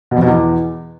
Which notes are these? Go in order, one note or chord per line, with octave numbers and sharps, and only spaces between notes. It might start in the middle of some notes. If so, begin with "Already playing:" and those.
B2
F2
B2
E2